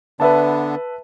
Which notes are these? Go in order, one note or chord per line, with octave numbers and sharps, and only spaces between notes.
D3 B3 D4 B4 E5 A5